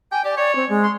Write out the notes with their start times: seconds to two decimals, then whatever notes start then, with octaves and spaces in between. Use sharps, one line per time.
0.12 G5 G#5
0.24 G4 D5
0.37 C#5 D5
0.56 C4
0.69 G#3
0.84 C6